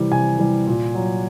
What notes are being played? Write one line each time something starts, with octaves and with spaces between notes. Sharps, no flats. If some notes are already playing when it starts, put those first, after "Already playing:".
Already playing: C3 E3 G3
C3 G#5
E3 G3
A#2
F#3